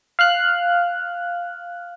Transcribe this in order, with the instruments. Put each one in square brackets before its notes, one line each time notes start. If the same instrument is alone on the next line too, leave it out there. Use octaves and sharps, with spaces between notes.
[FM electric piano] F5 F6 F#6